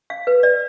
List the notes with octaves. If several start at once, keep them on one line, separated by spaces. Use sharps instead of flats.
F5
B4
D5